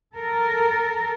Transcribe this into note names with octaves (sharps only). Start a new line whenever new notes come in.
A4 A#4